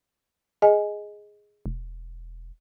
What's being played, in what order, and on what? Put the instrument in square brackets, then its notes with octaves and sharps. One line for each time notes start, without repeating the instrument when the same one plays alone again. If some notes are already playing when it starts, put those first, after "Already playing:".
[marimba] G#4 D#5 G#5
[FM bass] E1